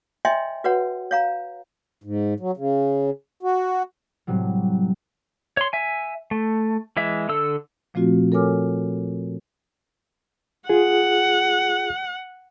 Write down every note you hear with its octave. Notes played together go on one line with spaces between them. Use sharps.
C#5 D#5 E5 G5 G#5 C6
F#4 B4 C#5 F#5
C#5 F5 A#5
G#2
F#3
C#3
F#4
A2 C3 F#3 G3
C#5 C6
E5 G#5
A3
E3 G#3 E5
D3 A4 E6
A#2 F3 A3 C4 F4 F#4
A4 A#4 C#5 G#5 D6 F6
F4 G#4 F#5